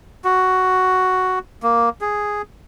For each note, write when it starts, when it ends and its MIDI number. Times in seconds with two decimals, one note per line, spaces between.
0.24 1.39 66
1.63 1.89 58
2.01 2.42 68